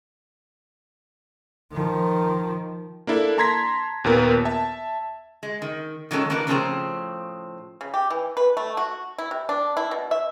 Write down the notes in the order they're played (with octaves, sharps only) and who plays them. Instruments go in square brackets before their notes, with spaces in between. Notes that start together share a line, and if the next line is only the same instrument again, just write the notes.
[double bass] D#3 F3
[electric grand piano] A#3 D4 E4 A4
A5 A#5 C6 G#6 A#6 B6
D#2 A#2 B3 A#4
E5 A5
[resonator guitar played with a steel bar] G#3
D#3
D#3 F#3 G#3 C#4 A4
D#3 A#3 D4 A#4 B4
A2 C#3 F3 C4 G#4 A#5
[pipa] C#3
G4
E3
B4
A3
F#4
E4
C3
D4
E4
B2
E5